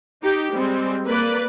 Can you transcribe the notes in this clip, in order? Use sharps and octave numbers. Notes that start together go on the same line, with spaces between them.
D#4 G4
G3 G#3 C4
A#3 B4 D5